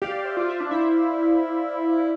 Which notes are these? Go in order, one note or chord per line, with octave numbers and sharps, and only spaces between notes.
G4 D5 F5
C5 E5
F4 D5
C5 E5
D4
E4 C5 E5